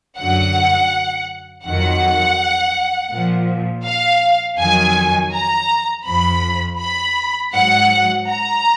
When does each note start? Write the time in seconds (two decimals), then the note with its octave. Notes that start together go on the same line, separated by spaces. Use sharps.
0.18 F#2 D3 F#3 F#5
1.65 F2 D#3 F#3 F#5
3.12 A#2 F3
3.85 F5
4.60 F2 D#3 F#3 G#5
5.33 A#5
6.06 F2 F3 B5
6.81 B5
7.54 G#2 F#3 F#5
8.28 A#5